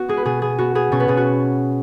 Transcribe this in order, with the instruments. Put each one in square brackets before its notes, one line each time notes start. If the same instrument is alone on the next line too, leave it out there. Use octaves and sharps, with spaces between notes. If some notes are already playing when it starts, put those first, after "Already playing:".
Already playing: [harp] B3 F#4
G#3 G#4
B4
B2 G#4
B3 G#4
B3 F#4
B3 G#4
B2 C#4 C#5
B3 B4
B2 G#4
F#4